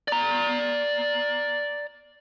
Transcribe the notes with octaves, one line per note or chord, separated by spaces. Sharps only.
D5 A#5